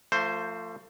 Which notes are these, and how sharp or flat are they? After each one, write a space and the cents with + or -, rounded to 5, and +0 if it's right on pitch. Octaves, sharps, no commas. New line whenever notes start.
F3 +0 A3 +30 C5 +0